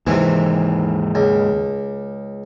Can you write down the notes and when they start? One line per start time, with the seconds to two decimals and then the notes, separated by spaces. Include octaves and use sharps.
0.07 D#2 G#2 C3 E3
1.15 C#2